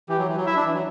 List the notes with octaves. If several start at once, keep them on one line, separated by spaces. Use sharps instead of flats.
E3 G4
F#3
E3
F#3
E4 E5
D4
E3
F#3